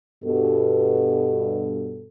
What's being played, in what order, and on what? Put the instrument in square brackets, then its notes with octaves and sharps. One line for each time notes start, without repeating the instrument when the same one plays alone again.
[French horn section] G2 B2 A4